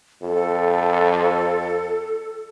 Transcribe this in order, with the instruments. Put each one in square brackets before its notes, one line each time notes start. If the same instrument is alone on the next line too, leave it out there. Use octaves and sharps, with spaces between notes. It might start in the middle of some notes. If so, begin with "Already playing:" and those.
[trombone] F2 [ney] A4